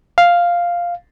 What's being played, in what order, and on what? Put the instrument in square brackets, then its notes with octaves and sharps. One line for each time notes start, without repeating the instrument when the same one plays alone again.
[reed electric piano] F5